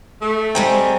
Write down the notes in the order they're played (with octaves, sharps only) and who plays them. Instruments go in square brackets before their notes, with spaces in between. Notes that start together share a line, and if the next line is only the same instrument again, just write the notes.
[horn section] A3
[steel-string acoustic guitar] G3 G#3 C4 [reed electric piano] G5 G#5 A#5